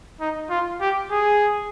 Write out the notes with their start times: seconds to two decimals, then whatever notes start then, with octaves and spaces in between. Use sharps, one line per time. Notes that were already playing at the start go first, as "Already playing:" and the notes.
0.20 D#4
0.50 F4
0.81 G4
1.11 G#4